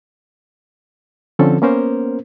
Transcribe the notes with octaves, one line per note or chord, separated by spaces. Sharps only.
D3 F3 C4 C#4 A4
A#3 B3 C#4 A#4 C5